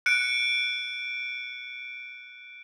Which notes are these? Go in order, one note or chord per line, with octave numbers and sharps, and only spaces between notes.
F#6 C#7 D7